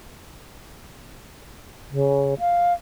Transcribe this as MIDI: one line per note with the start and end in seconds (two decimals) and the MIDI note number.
1.91 2.34 49
2.39 2.73 77